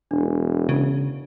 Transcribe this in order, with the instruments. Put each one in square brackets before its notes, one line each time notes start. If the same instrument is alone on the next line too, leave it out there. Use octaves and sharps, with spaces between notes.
[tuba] E1 [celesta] D4
[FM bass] C#3